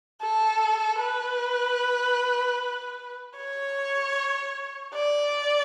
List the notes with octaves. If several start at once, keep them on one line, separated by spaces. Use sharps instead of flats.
A4
B4
C#5
D5